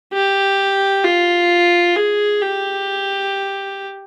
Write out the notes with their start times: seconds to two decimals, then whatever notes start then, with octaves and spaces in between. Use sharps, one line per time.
0.13 G4
1.05 F4
1.96 G#4
2.42 G4